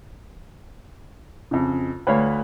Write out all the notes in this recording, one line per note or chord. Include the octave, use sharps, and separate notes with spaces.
F2 C#3
D2 B4 C#5 F5